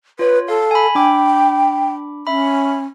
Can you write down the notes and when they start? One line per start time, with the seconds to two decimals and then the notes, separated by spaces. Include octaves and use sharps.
0.19 F4 B4 C#5
0.48 A4 F5
0.71 G#5 B5
0.95 D4 G5 B5 D6
2.27 C#4 E5 B5